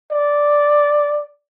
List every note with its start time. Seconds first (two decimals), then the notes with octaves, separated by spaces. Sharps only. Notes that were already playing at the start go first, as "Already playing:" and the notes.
0.12 D5